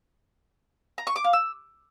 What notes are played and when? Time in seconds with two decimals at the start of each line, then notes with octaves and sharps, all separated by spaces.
0.98 A#5
1.07 C#6
1.16 D6
1.24 F5
1.33 E6